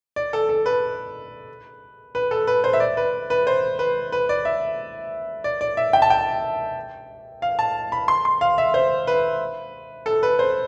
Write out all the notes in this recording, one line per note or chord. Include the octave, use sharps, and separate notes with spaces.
D5
A4
A4
B4
B4
A4
B4
C5
E5
D5
B4
B4
C5
B4
B4
D5
E5
D5
D5
E5
G5
A5
G5
F5
A5
B5
C6
C6
F5
E5
C5
B4
A4
B4
C5